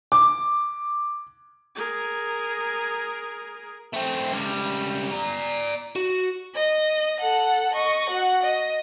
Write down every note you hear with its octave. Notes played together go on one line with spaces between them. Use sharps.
D6
G#4 A#4
A3 C4
C#2 G3
D5 A#5
F#4
D#5
A4 F#5
D#5 C#6
F#4 F#5
D#5